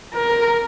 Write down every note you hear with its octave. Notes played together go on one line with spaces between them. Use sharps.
A#4